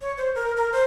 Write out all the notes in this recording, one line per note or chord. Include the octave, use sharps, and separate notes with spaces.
C#5
C5
A#4
A#4
C5